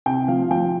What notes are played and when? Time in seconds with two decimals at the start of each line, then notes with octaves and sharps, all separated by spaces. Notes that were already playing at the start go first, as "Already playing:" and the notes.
0.06 C3 G5
0.28 F3 F5
0.51 F3 G5